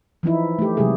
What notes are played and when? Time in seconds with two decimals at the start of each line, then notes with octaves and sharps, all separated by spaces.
0.23 E3 F3 D#4 E4
0.59 A3 G4
0.77 C3 F#3 G#3 G4 G#4